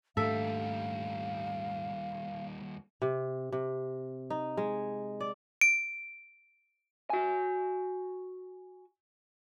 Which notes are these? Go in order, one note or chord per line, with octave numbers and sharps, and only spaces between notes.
D#2 G#2 G3 A3 D4 A4 E5 F5
C3
C3
D#4
G#3
D5
D7
F#4 G#5